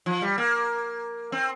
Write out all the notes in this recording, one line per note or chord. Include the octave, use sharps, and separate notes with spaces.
F3
G3
A#3
C4